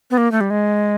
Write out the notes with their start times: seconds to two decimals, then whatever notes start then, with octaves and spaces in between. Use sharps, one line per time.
0.11 B3
0.18 A#3
0.32 A3
0.41 G3
0.50 G#3